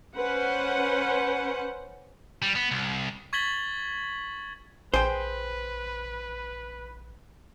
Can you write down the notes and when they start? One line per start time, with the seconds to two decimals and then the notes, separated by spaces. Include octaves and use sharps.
0.15 C#4 B4 C5 F#5
2.42 G3
2.56 B3
2.71 C2
3.33 C#6 G#6 A6 B6 F#7 G7
4.94 A#1 G#4 B4 C5 G5